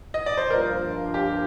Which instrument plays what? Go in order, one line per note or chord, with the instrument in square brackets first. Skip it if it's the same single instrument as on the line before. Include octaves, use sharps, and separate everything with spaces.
[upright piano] D#5
D5
C5
[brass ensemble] G2 F3 A#3 F4 [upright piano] A#4
[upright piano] G4